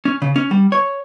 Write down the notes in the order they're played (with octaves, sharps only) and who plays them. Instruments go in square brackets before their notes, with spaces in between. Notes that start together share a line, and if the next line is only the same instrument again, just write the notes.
[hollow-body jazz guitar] C#4
C#3
C#4
G3
C#5